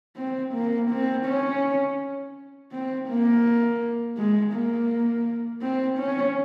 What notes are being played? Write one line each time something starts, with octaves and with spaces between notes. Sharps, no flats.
C4
A#3
C4
C#4
C4
A#3
G#3
A#3
C4
C#4